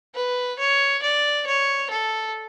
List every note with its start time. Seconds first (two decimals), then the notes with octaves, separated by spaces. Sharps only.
0.15 B4
0.59 C#5
1.03 D5
1.46 C#5
1.90 A4